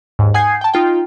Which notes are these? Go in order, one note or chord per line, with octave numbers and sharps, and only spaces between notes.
D#2 G#2
F#5 G#5 D#6 G6 G#6 C7
G5 A5
D#4 F4 G5